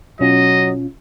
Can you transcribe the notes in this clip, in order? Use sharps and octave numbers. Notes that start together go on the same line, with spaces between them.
B2 F#3 C#4 F4 D#5